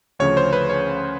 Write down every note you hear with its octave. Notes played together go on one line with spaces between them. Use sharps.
D2 C#3 F3 C#5
C5
B4
C#5